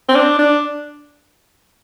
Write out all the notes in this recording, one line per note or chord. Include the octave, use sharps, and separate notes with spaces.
C4
D4
D4